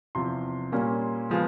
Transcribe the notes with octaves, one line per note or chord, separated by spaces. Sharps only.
E2 C3 F3 C6
A#2 G3 A#3 C#4
C#3 F3 G#3 B3